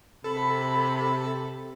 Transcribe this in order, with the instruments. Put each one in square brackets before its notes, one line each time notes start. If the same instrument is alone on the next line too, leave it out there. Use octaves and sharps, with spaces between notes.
[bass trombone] C3 [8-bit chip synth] A4 [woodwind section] B5